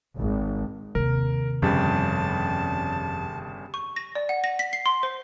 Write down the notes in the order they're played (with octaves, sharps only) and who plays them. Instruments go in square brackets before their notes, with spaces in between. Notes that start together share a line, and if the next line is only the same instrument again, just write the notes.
[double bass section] G#1
[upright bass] D#2 C3 [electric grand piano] A#4
[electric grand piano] G1 C#3 G3 [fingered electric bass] F2 [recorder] A5
[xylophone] C#6
A#6
D5
F#5
A#6
B6
C7
C6
C5